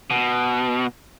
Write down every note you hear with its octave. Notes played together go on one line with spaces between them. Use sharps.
B2